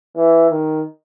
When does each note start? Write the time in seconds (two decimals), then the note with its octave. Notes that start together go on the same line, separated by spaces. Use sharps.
0.16 E3
0.50 D#3